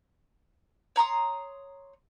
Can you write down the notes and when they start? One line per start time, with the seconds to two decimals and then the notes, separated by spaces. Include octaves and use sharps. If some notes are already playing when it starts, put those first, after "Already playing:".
0.96 C#5 A#5 C6 D#6